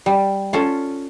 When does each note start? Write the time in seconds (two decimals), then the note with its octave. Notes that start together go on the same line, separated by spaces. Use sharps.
0.06 G3
0.53 C#4 F4 A4